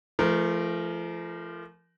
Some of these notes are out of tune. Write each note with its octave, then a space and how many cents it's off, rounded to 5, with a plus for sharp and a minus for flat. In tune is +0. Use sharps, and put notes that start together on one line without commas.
F3 -40 A3 -20 A#4 +0